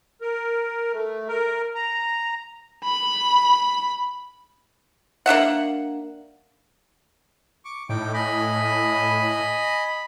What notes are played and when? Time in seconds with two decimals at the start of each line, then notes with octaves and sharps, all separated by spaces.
0.21 A#4
0.93 A3
1.28 A#4
1.75 A#5
2.84 B5
5.26 A#3 D4 E5 F#5
7.65 C#6 D6
7.89 A2 D#4 G5 D6
8.14 D#5 G#5 B5
9.85 B5